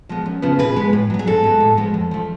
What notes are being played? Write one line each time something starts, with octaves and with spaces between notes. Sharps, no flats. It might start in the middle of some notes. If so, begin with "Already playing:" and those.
F3 G#3 B3
F#2
C#3 F3 B3
B2 G#4 B4
G#3 B3
A2
F#3 B3
G#4
G#2 F#4 A4
G#3 B3
A2
F3 G#3 B3
F2
F3 A3